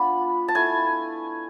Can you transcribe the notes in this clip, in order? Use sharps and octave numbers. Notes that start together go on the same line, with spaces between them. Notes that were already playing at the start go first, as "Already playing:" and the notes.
Already playing: B3 D4 F4 B5
A5
A3 E4 G#5